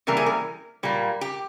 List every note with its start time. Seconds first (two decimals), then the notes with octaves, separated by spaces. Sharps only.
0.07 C3 E3 G3 A#3 A#4
0.17 G#4
0.26 A#4
0.83 A#2 G3 A#3
1.21 G4